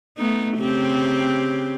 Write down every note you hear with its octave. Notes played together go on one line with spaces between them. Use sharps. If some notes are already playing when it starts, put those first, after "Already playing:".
A3 B3 D#4
C#3 C4 G4